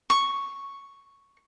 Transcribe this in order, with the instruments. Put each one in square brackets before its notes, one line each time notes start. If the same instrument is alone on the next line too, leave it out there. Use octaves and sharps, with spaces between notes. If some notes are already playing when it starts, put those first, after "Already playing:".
[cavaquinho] C#6